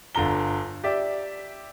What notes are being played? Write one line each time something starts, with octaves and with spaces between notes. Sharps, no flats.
G1 D3 F4 A#5 G7
G4 D5 E5